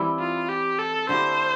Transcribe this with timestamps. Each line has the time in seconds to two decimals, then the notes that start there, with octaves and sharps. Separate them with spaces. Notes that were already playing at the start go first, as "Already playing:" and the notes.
Already playing: E3 G3 C4 E4
0.19 F4
0.49 G4
0.79 A4
1.09 D3 A3 E4 G4 C5